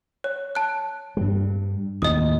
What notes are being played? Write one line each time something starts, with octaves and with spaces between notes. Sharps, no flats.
C#5
A5 F#6
G2 G3
D#2 A2 D#5 D#6